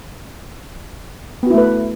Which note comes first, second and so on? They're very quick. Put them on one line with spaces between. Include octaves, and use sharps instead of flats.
B3 F#4 E4 A3 B4